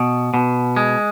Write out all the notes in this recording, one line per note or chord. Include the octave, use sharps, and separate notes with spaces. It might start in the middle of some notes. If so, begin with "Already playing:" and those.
Already playing: B2
B2
G#3